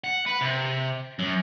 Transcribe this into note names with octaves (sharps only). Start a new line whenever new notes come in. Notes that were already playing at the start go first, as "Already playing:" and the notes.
F#5
B4
C3
F#2